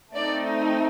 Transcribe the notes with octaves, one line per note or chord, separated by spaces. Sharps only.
A3 C4 D#4 D5